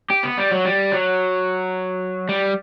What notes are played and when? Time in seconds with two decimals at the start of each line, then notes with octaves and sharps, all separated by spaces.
0.10 G4
0.23 B3
0.38 G3
0.51 F#3
0.65 G3
0.92 F#3
2.29 G3